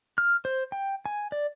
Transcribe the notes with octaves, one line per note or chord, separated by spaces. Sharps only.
F6
C5
G5
G#5
D5